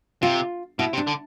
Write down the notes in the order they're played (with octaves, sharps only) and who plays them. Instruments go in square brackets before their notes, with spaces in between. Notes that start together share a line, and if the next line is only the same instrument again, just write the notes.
[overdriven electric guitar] C3 [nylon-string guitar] F4
[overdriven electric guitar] B2 [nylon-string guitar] E4
[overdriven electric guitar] C3
[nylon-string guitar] D4
[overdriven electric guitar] D3